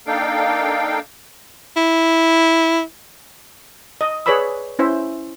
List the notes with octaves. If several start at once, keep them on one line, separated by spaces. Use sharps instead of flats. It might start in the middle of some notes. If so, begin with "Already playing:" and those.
A#3 D4 D#4 A4 F5 G5
E4
D#5
G#4 B4 C#5 D5 B5 E6
C#4 E4 C5 E5